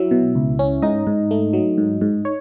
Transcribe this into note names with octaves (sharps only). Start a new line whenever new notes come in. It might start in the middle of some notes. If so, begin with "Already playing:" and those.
Already playing: F#3 E4 E5
B2
C#2
C#4
G#2 D#4 D#5
G#2
A3
F#3
G#2
G#2
C#5